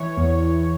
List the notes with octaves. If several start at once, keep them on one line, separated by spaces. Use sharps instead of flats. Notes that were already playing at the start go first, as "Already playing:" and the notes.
Already playing: E3 C#5
E2
E2